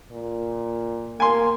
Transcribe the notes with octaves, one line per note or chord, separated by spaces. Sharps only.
A#2
A#3 G#5 C6